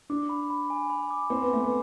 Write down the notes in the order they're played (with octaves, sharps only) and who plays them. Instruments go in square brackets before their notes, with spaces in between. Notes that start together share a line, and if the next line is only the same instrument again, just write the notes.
[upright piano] D4 [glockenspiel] D6
[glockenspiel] B5
B5
G#5
B5
D6
[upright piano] C4 [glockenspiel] B5
[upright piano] B3
[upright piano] A3 [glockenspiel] G#5
[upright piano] B3